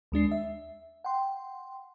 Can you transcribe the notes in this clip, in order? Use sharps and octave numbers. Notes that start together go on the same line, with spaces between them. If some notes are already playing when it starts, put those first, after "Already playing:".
D#2 G#3 D4 C7
E5
F#5 G5 C6